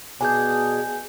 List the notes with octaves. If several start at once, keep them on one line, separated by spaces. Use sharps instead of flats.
B2 D4 G#4 G#5 G6